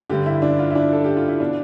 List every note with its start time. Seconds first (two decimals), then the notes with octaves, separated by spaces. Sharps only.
0.10 G2 D3 G4
0.26 E4
0.42 D4
0.59 F4
0.71 E4
0.75 D4
0.93 A4
1.04 G4
1.17 F4
1.28 E4
1.40 B2 D4